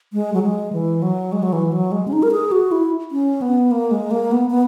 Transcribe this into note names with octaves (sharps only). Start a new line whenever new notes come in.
G#3
F#3
G#3
E3
F#3
G#3
F#3
E3
F#3
G#3
C#4
D#4
A#4
G#4
F#4
E4
C#4
B3
A#3
G#3
A#3
B3
B3